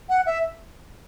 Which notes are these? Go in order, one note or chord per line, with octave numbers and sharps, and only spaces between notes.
F#5
E5